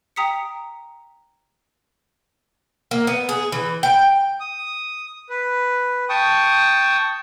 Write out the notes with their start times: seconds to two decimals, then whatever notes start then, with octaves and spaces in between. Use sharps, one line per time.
0.16 G5 A#5 D#6 B6 C#7
2.91 A#3
3.07 B3
3.29 G#4
3.52 E3
3.83 G5
4.40 D#6
5.29 B4
6.09 G5 A5 C#6 D#6